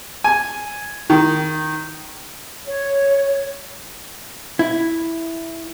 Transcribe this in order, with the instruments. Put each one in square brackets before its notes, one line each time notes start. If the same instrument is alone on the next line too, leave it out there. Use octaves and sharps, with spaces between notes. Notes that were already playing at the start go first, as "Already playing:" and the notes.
[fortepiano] G#5
D#3
[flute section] C#5
[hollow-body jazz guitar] E4